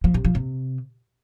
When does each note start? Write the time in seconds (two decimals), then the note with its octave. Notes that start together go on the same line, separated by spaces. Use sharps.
0.04 F3
0.14 C3
0.25 F3
0.35 C3